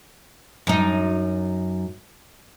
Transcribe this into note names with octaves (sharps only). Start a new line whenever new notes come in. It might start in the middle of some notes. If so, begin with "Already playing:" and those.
F#2 D#4